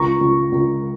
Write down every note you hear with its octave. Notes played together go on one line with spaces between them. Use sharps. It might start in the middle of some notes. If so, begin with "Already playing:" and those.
Already playing: C#2 A#5 C#6
C#2
C#2